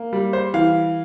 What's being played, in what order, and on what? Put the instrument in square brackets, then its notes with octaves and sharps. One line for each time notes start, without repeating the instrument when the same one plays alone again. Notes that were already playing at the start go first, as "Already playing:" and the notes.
Already playing: [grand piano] A#3
G3
C5
E3 F5